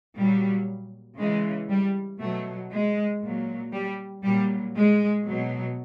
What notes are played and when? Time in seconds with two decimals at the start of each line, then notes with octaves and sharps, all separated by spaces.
0.16 A#2 F#3 G3
1.18 C#3 E3 G#3
1.69 G3
2.20 B2 F#3 A3
2.71 G#3
3.22 A#2 F#3
3.72 G3
4.23 A#2 F#3 G3
4.75 G#3
5.25 B2 F#3